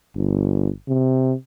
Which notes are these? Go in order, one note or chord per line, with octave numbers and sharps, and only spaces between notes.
G1
C3